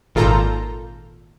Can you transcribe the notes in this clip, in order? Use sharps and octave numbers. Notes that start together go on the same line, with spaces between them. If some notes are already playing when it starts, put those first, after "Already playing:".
G#1 A#2 F4 A4 A#5 G6